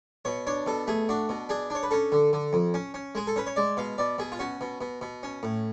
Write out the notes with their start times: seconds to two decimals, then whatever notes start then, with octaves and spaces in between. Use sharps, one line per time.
0.25 B2 C#5
0.47 D4 C#5
0.66 B2 A4
0.88 A3 G#4
1.09 D4 F#4
1.29 B2
1.49 D4 G#4
1.70 D4 C#5
1.83 B4
1.91 C#4 A4
2.12 D3
2.33 D3
2.53 F2
2.74 C#4
2.94 C#4
3.15 G#3 G#4
3.27 A4
3.36 C#4 B4
3.47 C#5
3.56 G#3 D5
3.77 B2 F5
3.98 B2 D5
4.18 B2 G#4
4.32 F4
4.39 C#4 F#4
4.61 B2
4.81 B2
5.01 B2
5.23 C#4
5.43 A2